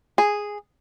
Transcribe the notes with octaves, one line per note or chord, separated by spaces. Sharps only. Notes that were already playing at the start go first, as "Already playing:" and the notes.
G#4